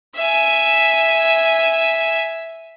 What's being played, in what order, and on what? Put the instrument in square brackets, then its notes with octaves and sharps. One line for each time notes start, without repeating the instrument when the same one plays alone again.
[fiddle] E5 G#5